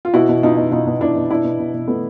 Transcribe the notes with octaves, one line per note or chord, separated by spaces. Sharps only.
F4
B2 E4 F#4
B2
B2 D#4 F4
B2
B2 D#4 F4
B2
B2 D4 E4
B2
B2 D4 E4
B2
B2
B2
B2 A3 B3